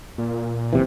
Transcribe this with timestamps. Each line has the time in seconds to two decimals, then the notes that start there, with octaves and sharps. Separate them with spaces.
0.18 A#2
0.73 F#1 C3 E3